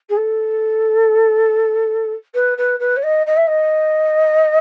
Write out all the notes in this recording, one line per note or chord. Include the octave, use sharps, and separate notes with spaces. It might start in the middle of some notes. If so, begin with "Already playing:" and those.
G#4
A4
B4
B4
B4
C#5
D#5
D#5
E5
D#5